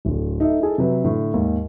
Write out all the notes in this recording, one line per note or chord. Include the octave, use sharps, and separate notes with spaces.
D1 D3
D#4 A4 E5
D#4 E4 G#4 A4
C3 F#3 B4
A2 D3
D#2 G#2